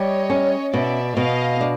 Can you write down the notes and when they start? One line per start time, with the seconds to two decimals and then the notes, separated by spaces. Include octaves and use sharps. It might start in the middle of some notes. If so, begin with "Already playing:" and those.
Already playing: G3 C#5 D#5
0.30 C#4
0.73 B2 D5 E5
1.17 B2 D#5 F5
1.61 D4